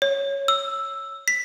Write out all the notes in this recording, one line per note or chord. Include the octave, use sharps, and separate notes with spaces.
C#5
E6
B6